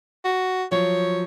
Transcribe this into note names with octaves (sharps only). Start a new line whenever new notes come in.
F#4
F3 F#3 C#5